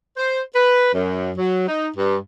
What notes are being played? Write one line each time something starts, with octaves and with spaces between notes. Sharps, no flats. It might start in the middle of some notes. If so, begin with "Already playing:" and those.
C5
B4
F#2
F#3
D#4
G2